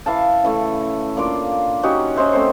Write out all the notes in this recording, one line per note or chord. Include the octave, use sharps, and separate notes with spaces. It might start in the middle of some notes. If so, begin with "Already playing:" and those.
E3 E5 F5 A5
C#3 E3 A3
A#3 D4 F4 D6
C#4 D#4 F#4 G4
C#4 D#4 C5 E5
A3 C4 C5